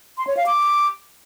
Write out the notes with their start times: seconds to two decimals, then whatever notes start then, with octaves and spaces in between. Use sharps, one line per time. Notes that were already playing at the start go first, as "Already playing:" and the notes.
0.18 C6
0.27 C#5
0.37 F5
0.46 D6